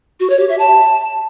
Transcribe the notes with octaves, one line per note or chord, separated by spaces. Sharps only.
F#4
C#5
G4
E5
A5